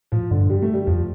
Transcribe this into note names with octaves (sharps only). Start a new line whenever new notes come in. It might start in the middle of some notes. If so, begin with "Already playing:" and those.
A2 F3
G2 D3
G3
A3
G3
F2 F3